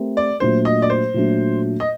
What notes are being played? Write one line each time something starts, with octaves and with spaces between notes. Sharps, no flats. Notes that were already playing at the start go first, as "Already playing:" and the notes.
Already playing: A3 C4 G4 A#4
D5
A#2 F#3 A3 D4 C5
D#5
D5
C5
A#2 F#3 A3 D4
D#5